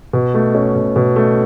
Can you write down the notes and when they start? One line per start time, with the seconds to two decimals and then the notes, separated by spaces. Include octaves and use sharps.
0.13 B2
0.34 A3
0.55 C#4
0.75 B2
0.96 B2
1.16 A3